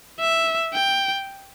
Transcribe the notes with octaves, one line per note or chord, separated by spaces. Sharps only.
E5
G5